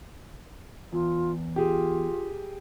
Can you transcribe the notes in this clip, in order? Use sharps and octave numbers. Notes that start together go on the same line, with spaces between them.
E2 F4
F4 G4 G#4